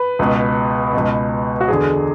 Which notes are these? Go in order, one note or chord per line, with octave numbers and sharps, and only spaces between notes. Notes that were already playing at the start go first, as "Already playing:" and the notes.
Already playing: B4
C#2 B2
C#2 B2
F#4
E2 D3 G#4